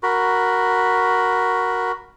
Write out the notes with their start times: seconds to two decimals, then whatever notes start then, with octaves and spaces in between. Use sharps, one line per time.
0.03 F#4 A#4 B5